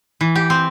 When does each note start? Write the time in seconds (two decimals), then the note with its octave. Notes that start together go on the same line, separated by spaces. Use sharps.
0.21 E3
0.36 G4
0.50 C4